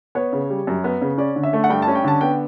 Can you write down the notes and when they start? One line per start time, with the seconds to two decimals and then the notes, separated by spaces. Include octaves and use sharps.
0.15 B3 C#5
0.33 C#3
0.50 G3
0.67 F#2
0.84 B3
1.01 C#3
1.18 C#4 D5
1.36 D3
1.43 E5
1.53 A3
1.64 F#5
1.70 G2 G5
1.82 A5
1.87 C#4
1.95 G5
2.04 D3 A5
2.21 B3 G5